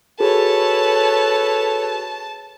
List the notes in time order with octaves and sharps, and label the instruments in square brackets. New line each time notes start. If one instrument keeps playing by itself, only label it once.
[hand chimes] F#4 G#4 [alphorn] A4 [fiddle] B4 C#5 [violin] A5